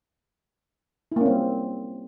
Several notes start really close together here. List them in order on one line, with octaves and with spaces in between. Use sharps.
E4 A#3 C#4 C4 G3